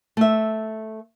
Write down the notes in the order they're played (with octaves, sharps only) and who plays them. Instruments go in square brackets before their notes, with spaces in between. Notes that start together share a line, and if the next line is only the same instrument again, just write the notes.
[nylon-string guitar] A3 E5